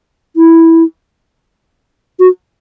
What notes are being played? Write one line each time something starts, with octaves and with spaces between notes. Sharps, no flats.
E4
F#4